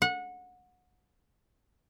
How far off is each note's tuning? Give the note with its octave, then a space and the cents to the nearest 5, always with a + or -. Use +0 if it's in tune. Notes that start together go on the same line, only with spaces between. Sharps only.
F#5 -25